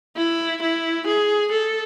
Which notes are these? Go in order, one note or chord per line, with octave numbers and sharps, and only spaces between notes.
E4
E4
G#4
A4